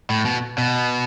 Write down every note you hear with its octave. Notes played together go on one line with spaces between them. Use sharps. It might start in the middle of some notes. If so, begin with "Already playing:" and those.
A2
B2
B2